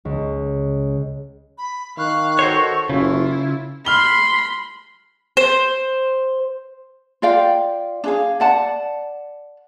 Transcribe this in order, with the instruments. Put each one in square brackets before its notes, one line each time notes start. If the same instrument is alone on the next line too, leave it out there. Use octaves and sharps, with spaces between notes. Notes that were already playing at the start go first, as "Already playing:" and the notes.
[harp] C#2
[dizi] B5
[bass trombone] D#3 [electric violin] F5 F#6 [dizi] C#6
[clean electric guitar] F#4 C5 C#5 [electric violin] A4
[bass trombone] F#1 [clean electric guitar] C#3 [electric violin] E4 F4
[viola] B5 C6 [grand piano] F6 G7
[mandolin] C5
[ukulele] F4 D5 F5 G5
D4 G#4 F5
D5 F#5 A5